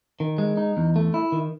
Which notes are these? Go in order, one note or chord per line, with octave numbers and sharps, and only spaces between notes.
D#3
G#3
D#4
E2
A3
E4
D#3